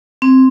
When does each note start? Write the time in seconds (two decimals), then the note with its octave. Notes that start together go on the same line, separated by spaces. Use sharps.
0.22 C4